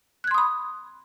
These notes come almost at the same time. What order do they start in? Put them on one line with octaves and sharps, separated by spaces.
F#6 G#6 C6 D#6 B5